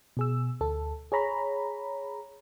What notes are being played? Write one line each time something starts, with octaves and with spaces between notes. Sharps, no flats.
B2 G#4 E6
D2 A4
G#4 C#5 A#5 B5